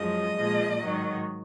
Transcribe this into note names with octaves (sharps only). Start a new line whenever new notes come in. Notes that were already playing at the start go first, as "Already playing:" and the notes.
Already playing: F#2 F3 G#3 D#5
A#2 F3 G#3
G#2 D#3 F#3